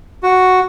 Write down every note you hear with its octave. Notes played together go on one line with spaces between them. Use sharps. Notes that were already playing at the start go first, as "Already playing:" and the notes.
F#4